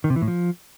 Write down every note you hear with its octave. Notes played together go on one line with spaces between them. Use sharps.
D#3
C3
E3
A2
F3